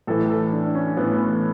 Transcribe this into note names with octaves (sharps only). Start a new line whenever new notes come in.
A2 E3 A4
A4
D4
C#4
A2 E3 B3